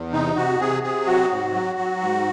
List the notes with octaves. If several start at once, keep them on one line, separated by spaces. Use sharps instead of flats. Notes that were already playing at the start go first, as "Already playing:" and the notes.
Already playing: E2
C3 D#4
C3 F#4
C3 G#4
C3 G#4
F#3 F#4
G#2
F#3
F#3
G#2